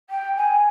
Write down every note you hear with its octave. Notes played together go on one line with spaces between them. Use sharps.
G5
G#5